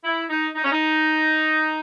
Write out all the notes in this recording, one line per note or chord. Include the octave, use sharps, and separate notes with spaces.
E4
D#4
D#4
C#4
D#4